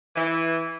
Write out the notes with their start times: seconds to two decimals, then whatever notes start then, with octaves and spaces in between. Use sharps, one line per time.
0.16 E3